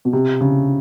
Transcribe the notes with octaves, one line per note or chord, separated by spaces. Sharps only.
B2
C3
C#3